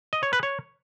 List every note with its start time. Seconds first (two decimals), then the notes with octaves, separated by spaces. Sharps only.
0.13 D#5
0.23 C#5
0.33 B4
0.43 C#5